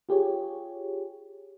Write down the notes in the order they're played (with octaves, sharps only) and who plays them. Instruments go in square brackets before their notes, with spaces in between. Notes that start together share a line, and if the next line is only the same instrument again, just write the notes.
[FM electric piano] F4 G4 G#4 C#5